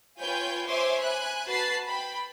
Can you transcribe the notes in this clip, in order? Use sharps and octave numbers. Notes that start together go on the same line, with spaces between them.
F4 B4 C#5 G5 G#5 G6
C5 C#5 E5 G#5 C6 D6
G#5 B5 F#6
F#4 B4 A5 B5 A6 C7
G5 B5